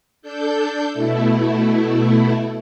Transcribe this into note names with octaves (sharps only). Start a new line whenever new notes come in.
D4 A4 G6
B2 A3 E4